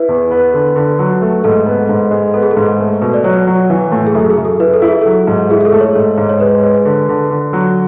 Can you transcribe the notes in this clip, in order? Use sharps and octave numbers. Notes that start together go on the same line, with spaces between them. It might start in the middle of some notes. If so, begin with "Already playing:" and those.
Already playing: E4 B4
E2
B3
D3
D3
F#3
A3
G#2 A4
B3
G#2
G#3
B3 A4
G#4
A4
G#2
A3
B2
D5
F#3 C#5
F#3
E3
A2
G#4
F#2 A4
G#4
F#2
A4
E4 B4
A4
E4
G#4
F#3 A4
G#2
E4 G#4
G#4
A4
A3
C#5
G#2
G#2
C#5
G#3 B4
G#3
D3
D3
D3
F#3